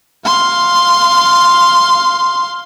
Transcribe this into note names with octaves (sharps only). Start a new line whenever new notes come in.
F5 C6